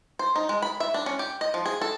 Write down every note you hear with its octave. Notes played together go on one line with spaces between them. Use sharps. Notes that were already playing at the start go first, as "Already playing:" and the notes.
C5
D#4
G#3
B5
E5
D4
C#4
G4
D#5
F3
G#4
A4